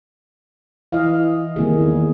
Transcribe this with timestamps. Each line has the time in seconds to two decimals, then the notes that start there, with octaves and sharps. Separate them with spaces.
0.92 E3 D#5 F5
1.56 C2 D#3 A#3 G#4
1.77 E2